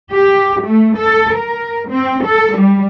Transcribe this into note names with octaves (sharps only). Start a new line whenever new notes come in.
G4
A3
A4
A#4
C4
A4
G3